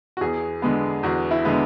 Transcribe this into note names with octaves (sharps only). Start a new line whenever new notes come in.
F#4
E2 G#4
D3 G#3 B3
E2 F#4
E4
D3 G#3 B3